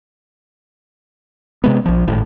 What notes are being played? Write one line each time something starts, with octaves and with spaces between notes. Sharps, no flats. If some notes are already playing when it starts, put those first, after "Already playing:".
C3 G#3 B3
A#1 F3
G#1 A2